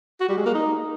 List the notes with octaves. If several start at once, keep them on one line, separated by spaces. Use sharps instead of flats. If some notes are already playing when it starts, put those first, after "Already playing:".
F#4
G3
G#3
A#3
D#4